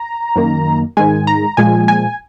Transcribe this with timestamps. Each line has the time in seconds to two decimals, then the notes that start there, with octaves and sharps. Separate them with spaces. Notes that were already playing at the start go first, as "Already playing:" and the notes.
Already playing: A#5
0.36 F#2 D#3 A#3
0.97 G#2 D#3 G#3 G#5
1.27 A#5
1.57 A#2 F3 G#3 G#5
1.88 G#5